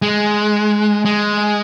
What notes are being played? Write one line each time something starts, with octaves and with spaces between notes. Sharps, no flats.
G#3
G#3